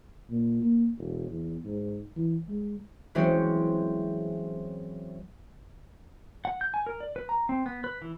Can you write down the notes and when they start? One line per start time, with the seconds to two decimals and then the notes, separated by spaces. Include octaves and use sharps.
0.30 A#2
0.62 A#3
0.99 E1
1.28 E2
1.64 G#2
2.16 E3
2.49 G#3
3.15 E3 F#3 G#3 C4 C#4
6.45 F#5
6.61 G6
6.74 G#5
6.87 A#4
7.01 D5
7.16 B4
7.29 A#5
7.49 C4
7.66 B3
7.84 B4
8.02 E3